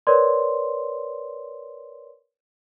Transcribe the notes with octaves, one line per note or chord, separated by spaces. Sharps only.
A#4 B4 C#5 D5 C6